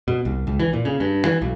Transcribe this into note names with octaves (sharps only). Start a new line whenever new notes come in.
B2
C2
C#2
E3
A#2
C#3
G2
E3
B1